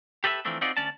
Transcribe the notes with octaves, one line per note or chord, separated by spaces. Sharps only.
G4 A4 B4 C5 E5
E3 F3 A3 C4 D4
C4 C#4 D#4 F4 F#4 D5
D2 C#4 D5 A5